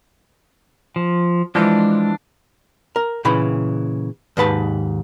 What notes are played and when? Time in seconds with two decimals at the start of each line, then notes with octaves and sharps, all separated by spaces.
0.96 F3
1.55 E3 F3 G#3 D4
2.96 A#4
3.25 A#2 C#3 E3 B5
4.37 D#2 G#2 B4 A5